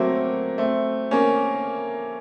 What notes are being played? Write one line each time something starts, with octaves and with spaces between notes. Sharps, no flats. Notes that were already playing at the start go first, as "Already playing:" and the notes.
Already playing: F#3 A3 A#3 C4
A3 C4
A#3 C#4